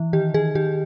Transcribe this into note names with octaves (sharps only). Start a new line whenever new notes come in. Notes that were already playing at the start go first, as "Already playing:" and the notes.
Already playing: E3
D#3 G4
D#3 G#4
D#3 G4